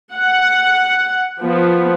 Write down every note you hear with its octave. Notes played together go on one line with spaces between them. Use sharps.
F#5
F3 B3